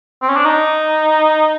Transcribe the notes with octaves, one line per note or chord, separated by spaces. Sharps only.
C4
C#4
D4
D#4